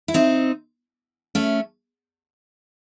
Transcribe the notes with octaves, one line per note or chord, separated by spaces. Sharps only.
E4
C4 D#4
A3 C#4